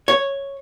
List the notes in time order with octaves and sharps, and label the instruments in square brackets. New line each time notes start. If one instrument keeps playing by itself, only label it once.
[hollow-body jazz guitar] C#5